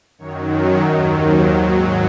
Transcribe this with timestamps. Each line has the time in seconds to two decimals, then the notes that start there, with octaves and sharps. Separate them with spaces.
0.18 F#2 D#3 F#3 C#5
0.53 C#5
0.86 D#2 D#3 F#3
1.20 C5
1.54 G#2 F#3